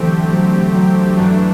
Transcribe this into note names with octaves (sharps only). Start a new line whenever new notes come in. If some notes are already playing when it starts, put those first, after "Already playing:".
Already playing: D3 E3 F#3 A3 C4 G4
F#3
F#3
G2 E3 F#3 A3 D4